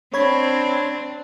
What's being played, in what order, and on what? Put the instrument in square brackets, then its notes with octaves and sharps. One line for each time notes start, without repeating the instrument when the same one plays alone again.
[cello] C4 [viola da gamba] D4 [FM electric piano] C#5 B5 G#6